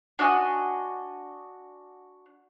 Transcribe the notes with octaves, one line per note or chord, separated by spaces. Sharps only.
D4 F#4 D#5 G#5